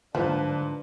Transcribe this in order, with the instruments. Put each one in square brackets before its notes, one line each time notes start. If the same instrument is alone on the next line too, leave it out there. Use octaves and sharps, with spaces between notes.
[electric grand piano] G#2 B4 [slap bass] D3 F#3 A#3 [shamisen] F3 [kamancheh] D4